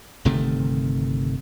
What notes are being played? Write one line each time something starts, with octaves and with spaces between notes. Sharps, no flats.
G1 C3 D#3 A3